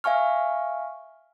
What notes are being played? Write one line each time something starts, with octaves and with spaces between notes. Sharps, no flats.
E5 F5 G#5 C#6 F6